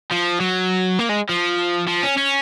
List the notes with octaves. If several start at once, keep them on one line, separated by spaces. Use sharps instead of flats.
F3
F#3
A#3
G#3
F3
F3
C#4
C#4